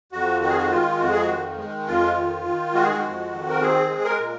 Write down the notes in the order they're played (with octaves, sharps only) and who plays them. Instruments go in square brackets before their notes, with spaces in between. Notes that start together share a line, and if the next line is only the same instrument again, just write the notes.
[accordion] F2 F#4
D#3 F#4
G#4
F#4
G#3 F4
F2 F#4
G#4
F#4
D#3
G#3
F2 F4
D#3
D#3
G#3 F#4
G#4
F#4
F2
D#3
A#4
C4 G#4
G#3
A#4
A#2